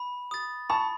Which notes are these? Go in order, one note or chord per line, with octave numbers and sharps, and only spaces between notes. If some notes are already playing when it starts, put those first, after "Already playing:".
Already playing: B5
D#6 A6
A5 B5 C#6